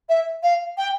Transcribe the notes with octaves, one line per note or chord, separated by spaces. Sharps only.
E5
F5
G5